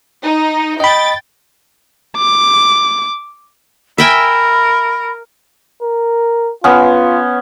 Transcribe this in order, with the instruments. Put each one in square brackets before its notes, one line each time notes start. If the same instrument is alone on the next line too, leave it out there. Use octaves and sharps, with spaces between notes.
[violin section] D#4
[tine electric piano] D#5 B5 [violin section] G5 A6
[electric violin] D6
[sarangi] A#4 [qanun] E5 G5 G#5 [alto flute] B5
[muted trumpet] A#4
[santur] B3 C#4 [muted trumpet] F4